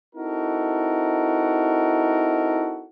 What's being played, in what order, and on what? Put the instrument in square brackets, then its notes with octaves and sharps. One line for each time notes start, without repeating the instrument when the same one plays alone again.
[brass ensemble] C4 D#4 E4 F#4 A4 A#4